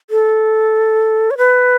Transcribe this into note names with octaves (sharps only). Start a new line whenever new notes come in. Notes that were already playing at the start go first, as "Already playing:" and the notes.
A4
C#5
B4